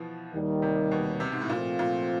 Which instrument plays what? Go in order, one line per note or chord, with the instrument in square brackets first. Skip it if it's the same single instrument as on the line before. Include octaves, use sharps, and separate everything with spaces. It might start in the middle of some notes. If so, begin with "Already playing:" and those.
Already playing: [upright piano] B2 E3 F3
[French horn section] D#2 D#3 G3
[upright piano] C3
B2
C3
G#2
A2
[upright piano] A#2 [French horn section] F3 A3 C4 F4
[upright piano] A#2